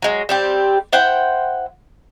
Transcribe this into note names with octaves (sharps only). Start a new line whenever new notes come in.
F#3 G#3
G3 C4 G4
E4 C5 F#5 G5